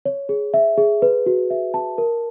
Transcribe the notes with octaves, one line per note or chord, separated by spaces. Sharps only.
C#5
G#4
E5
G#4
B4
F#4
E5
A5
A#4